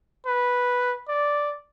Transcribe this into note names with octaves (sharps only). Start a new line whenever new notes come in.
B4
D5